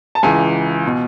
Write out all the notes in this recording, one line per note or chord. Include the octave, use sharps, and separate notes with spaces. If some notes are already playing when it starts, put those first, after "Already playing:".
A5
C#2 C#3 E3 G#5
B2